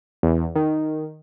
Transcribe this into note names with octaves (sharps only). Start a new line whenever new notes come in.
E2
D#3